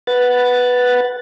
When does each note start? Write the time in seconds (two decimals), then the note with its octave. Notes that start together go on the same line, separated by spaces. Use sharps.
0.07 B4 F#5 A6